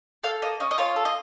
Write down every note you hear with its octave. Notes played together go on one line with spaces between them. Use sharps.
A4 F5
A#3 D#5
C#4 D#5
D#5
F4 C#5
A4
D#5